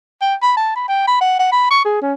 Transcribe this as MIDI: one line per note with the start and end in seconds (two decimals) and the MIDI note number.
0.21 0.35 79
0.42 0.53 83
0.57 0.73 81
0.76 0.85 83
0.89 1.07 79
1.07 1.19 83
1.21 1.38 78
1.39 1.50 78
1.52 1.68 83
1.70 1.81 85
1.85 2.00 68
2.02 2.13 61